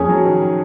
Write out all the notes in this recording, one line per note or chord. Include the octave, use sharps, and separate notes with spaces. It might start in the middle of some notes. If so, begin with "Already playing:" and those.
Already playing: F2 A#3 C#4 G#4
F#3
D#3